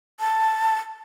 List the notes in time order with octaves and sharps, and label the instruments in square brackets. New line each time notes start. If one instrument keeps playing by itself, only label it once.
[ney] A5